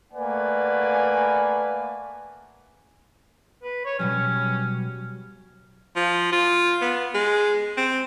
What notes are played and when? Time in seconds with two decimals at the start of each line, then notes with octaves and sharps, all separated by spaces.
0.12 A3 A#3 B4 D5 F#5 G#5
3.63 B4
3.86 C#5
3.99 B2 F#3 G3 C#4
5.96 F3
6.33 F4
6.82 B3
7.14 G#3
7.77 C4